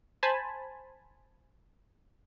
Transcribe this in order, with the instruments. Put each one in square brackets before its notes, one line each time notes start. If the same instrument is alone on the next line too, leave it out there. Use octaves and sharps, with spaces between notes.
[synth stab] C5 G#5 A5 B5